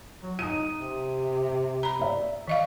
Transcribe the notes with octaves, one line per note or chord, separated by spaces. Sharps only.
F#3
D#4 D#6 D#7
C3
A#5 B5
D5 E5
D#3 D#5 F5